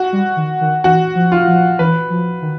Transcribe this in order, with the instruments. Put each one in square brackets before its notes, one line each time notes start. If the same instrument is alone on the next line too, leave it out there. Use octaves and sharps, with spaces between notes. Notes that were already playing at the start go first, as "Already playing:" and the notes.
Already playing: [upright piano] F#4
[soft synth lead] G3
D#3
D#3
[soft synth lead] E3 [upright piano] F#4
[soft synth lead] F3
[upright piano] F4
[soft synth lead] F3
[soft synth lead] E3 [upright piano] B4
[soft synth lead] F3
D#3